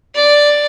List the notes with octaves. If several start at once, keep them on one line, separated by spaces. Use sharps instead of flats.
D5